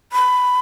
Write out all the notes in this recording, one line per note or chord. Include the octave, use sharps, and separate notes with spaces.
B5